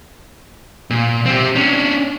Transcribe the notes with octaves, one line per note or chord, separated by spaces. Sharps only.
A#2
C4 G4
C#4 D4